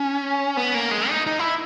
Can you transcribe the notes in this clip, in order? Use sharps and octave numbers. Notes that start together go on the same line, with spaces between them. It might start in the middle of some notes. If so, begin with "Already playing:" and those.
Already playing: C#4
B3
A#3
G#3
D#4
D#4
E4